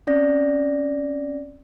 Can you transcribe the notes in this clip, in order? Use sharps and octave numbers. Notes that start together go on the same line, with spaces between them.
C4 C#4 D5 A#6